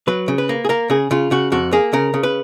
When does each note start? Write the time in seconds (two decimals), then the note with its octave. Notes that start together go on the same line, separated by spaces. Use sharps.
0.08 F#3 B4
0.28 C#3
0.38 B4
0.49 A#3
0.65 G#4
0.69 A#3 A#4
0.90 C#3 G#4
1.11 C#3 F4
1.31 C#3 F#4
1.52 F2 F#4
1.73 A#3 G#4
1.93 C#3 A#4
2.14 C#3
2.23 B4